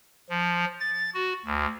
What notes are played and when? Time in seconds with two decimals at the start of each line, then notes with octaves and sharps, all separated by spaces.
0.30 F3
0.80 A6
1.14 F#4
1.46 D2